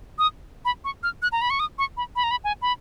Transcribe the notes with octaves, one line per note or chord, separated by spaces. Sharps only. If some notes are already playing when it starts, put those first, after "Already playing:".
D#6
B5
C#6
F6
F#6
A#5
B5
C#6
D#6
C#6
B5
B5
A#5
B5
G#5
B5